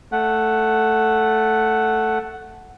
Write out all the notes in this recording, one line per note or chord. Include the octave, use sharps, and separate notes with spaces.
A3 F#5